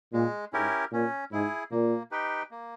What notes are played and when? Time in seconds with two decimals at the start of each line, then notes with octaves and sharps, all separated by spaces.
0.13 A#2 G#3
0.53 G#2 C#4 E4 G4 A#4
0.92 A#2 C#4
1.32 G#2 E4 G#4
1.71 A#2 A#3
2.11 D#4 G4 B4 G5
2.51 A#3